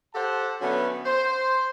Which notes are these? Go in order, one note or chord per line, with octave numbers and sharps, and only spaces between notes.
G4 A4 C5 F#5 A5
D3 F#3 A3 B3 C#4
C5